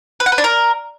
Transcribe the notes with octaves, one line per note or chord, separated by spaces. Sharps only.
B4
F#5
B4
D4
A#4